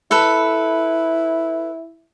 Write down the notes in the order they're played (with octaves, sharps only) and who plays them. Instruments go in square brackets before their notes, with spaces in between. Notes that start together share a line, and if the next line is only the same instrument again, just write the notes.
[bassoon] E4 [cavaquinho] A4 B4